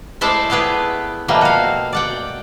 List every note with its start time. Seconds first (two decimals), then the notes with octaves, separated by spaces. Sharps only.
0.21 G#3 A3 E4 C5 D5 E5
0.50 A3 B3 G4 G#4 B4
1.28 B2 F3 G3 A3 A#3
1.41 F#4 F5
1.93 D5 F#5 G5